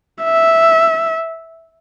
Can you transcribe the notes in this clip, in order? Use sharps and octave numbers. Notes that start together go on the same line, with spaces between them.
E5